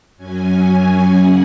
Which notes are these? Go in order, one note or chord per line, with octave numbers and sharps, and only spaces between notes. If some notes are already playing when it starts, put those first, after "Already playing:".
F#2 F#3 C#4 G#5
C#3 A#3 F#5